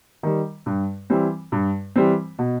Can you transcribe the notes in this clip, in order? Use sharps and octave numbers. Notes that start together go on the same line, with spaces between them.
D#3 G3
G2
E3 G3 C4
G2
E3 G3 C4
B2